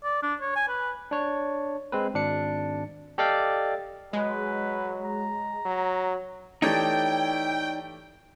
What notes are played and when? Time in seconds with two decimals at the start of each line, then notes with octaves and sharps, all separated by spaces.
0.04 D5
0.23 D4
0.41 C#5
0.56 G#5
0.69 B4
1.11 D4 C#5
1.92 G#3 C4 B4
2.14 G#1 D4 C#7
3.18 G4 A4 D5 D#5 F5 G5
4.13 F#3 G#3 B4
5.05 A#5
5.66 F#3
6.62 E3 A3 D#4 G4 C#5 D5 G5